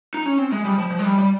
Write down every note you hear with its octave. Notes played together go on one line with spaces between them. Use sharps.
D#4
C#4
C4
G#3
G3
F3
F3
G#3
G3
G3